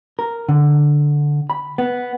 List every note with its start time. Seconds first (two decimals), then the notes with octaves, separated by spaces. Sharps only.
0.19 A#4
0.49 D3
1.50 B5
1.78 B3